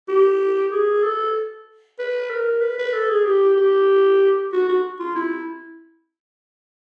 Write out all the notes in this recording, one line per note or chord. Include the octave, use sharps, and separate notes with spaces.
G4
G#4
A4
B4
A#4
B4
B4
A4
G#4
G4
G4
F#4
F#4
F4
E4